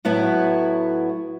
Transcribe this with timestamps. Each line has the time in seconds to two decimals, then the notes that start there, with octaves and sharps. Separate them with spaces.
0.05 A2 F#3 B3 E4 F#4